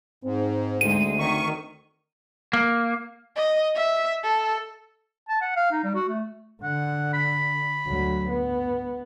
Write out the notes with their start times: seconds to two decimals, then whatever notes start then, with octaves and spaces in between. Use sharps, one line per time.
0.24 G#2 C4
0.81 D2 G#3 C4 D#7
1.19 D#3 C#6
2.53 A#3
3.36 D#5
3.75 E5
4.24 A4
5.29 A5
5.42 F#5
5.56 F5
5.72 D#4
5.84 G3
5.95 F#4
6.09 A3
6.63 D3 F#5
7.13 B5
7.87 D2 F#3
8.29 B3